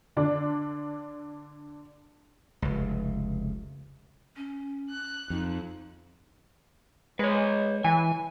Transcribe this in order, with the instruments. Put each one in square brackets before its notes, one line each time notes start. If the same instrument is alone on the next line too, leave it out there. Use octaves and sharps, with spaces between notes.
[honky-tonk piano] D3 D4
[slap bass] F1 C#2
[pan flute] C#4
[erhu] F#6
[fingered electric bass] F2 [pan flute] D#4
[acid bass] G#3 [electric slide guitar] B4 C#5
[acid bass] E3 [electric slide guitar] G#5